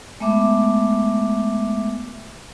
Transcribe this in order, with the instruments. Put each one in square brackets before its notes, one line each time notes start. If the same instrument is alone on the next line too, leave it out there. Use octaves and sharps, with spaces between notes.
[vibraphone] G#3 A3 B3 E5 D6